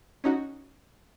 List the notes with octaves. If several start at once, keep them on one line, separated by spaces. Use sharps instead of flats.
C#4 D#4 F#4